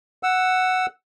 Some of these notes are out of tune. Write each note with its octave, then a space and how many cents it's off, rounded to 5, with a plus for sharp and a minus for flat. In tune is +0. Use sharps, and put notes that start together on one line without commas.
F#5 +0 E6 +5